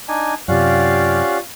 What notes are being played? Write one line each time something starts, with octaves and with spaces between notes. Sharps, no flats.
D4 D#4 G#5
F#2 C3 C#4 F4 G4 D5 F5 F#5